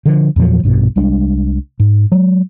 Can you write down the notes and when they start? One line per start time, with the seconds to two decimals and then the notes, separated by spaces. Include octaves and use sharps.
0.06 D3 F3
0.36 E2 A#2 F3 F#3
0.63 A#1 G2 B2
0.96 C2 G3 G#3 D4
1.80 G#2
2.12 F#3 G#3